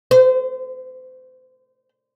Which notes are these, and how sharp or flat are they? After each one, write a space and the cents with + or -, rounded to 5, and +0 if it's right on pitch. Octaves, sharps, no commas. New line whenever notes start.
C5 -35